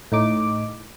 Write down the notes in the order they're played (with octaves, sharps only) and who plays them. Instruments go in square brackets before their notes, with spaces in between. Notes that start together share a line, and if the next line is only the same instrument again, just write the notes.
[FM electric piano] A2 D#4 D6